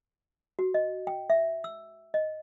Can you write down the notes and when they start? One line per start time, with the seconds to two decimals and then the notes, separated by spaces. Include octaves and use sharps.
0.59 F#4
0.74 D#5
1.07 G5
1.30 E5
1.64 E6
2.14 D#5